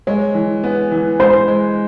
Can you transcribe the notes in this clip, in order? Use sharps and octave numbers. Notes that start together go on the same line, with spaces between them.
G#3 C#5
E3
B3
E3
G#3 C5
G#3